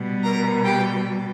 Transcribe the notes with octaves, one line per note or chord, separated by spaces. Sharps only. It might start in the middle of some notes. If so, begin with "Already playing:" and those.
Already playing: B2 G3
A#4 A#5
G4 G5